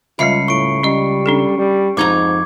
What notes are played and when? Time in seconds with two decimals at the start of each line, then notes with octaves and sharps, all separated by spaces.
0.19 C#2 G3 F4 D#5 E5 B5 C7 C#7
0.48 A2 C#6 D7
0.83 G3 C#4 D#5
1.26 C#4 D4 A4
1.59 G3
1.97 F2 G#2 D#4 A#5 D6 G#6